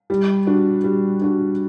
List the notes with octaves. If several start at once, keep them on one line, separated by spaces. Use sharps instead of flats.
G3
D4 F#4
G3
D4 F#4